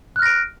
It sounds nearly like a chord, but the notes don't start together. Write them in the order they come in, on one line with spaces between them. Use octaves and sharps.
F#6 F6 A#6 D7